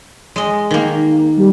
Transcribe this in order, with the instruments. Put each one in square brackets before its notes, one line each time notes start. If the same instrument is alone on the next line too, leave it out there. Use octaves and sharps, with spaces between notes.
[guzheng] G#3 D#5
D#3 A#3
[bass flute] G3